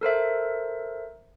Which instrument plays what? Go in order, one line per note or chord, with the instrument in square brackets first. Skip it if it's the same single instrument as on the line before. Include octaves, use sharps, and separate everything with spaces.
[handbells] A4 A#4 C5 E5